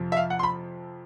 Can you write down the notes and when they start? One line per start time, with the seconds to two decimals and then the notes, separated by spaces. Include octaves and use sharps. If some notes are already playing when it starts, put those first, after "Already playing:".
Already playing: F2 C3 F3
0.12 E5
0.17 F5
0.30 F#5
0.39 C6
0.43 B5